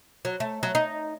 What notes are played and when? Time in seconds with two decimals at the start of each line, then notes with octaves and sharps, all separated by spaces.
0.25 F#3
0.40 A3
0.63 F#3
0.75 D#4